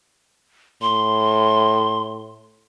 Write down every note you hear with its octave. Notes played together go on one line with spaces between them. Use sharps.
A2 C6